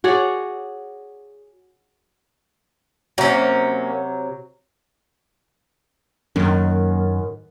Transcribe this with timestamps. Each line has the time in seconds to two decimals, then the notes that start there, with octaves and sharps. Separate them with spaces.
0.04 F#4 G#4 C#5 D5
3.18 C3 F#3 A#3 C#4
6.36 F#2 D#3 F#3 A#3 C#4